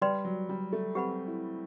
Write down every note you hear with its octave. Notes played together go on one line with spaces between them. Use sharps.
G3 B4 D5 G5 C6
F#3
G3
A3
C4 G4 B4 F#5 B5
E4